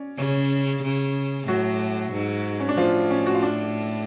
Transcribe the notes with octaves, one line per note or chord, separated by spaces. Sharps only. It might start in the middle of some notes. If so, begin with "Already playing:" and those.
Already playing: C#4 C#5 D5
C#3 C#4 C#5
C#3
A2 F#3 F#4
G#2
C#4
D4
A2 F3 F4
C#4
F#4
F4
D4